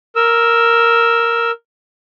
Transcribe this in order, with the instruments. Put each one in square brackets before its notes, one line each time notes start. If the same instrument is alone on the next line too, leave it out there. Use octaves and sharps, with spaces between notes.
[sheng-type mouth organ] A#4 E6